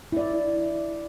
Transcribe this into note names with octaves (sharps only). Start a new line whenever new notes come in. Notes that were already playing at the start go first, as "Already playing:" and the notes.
E4 D5